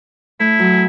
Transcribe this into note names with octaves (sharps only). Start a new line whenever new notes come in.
A3 E4
F#3
G#5